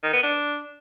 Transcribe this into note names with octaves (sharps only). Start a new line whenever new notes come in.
D#3
B3
D4